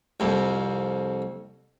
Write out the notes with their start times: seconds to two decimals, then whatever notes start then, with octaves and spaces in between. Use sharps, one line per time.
0.20 C2 F2